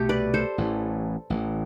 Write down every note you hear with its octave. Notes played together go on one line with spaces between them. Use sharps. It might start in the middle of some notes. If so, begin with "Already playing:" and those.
Already playing: C2 B2 A3 G4 A4
B4 D5
A4 C5
A1 A2 E3
A1 A2 E3